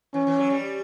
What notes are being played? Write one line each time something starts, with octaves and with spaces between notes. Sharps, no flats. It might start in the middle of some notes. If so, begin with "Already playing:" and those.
E3 C#4
E3
F#3
G3